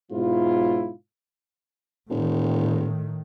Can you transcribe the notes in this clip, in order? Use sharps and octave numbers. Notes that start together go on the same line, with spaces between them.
G#2 B2 F#3 E4 F4
E1 A2 D#3